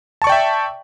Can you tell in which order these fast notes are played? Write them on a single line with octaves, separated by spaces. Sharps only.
A5 C#6 D5 G5 E5